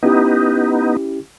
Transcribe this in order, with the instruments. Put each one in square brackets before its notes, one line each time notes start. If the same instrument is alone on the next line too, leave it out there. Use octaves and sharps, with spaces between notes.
[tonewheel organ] B3 D#4 [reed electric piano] C#4 E4 G4